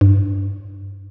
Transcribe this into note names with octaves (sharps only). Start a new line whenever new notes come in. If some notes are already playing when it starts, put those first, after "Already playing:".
G2